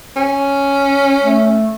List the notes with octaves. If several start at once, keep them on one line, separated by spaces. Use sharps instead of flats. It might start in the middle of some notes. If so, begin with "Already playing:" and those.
C#4
A3